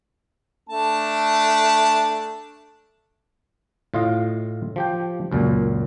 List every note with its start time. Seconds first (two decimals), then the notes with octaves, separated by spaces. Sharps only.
0.69 A3 D4 A5
3.94 A2 F4 D#5 F5
4.76 F3 G4 G5
5.32 C#2 F#2 A#2